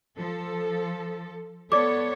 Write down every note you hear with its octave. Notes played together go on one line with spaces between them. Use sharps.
F3 A4
B3 A4 C#5 D5 D6